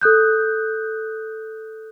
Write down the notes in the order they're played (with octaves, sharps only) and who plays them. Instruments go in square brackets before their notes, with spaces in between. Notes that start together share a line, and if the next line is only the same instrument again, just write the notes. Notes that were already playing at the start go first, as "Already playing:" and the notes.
[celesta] A4 D#6 F#6 G6